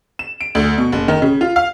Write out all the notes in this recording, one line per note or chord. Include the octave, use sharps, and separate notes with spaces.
E7
D7
D2
B2
F#1
D#3
C#3
F4
F5